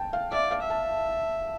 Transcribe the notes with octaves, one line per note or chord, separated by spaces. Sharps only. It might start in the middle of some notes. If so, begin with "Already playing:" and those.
Already playing: G5 A5
F5
D5 E5
F5
E5
A5